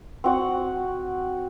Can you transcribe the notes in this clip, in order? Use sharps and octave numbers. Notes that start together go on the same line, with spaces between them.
C4 F#4 F#5